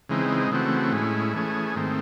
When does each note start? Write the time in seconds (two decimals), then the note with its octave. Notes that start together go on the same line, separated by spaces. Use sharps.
0.09 C#3 E3 G#3 C4 D#4
0.52 C#3 E3 A3 C4 F#4
0.92 A2 G#3 C#4 E4
1.34 E3 A3 C#4 G#4
1.75 G#2 D#3 A3 C4